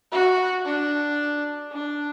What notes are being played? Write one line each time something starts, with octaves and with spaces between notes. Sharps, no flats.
F#4
D4
D4